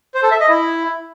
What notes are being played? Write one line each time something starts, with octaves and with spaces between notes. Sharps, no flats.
C5
A4
E5
D#5
E4